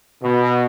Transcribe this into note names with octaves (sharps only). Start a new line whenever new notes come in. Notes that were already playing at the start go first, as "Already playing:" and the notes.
B2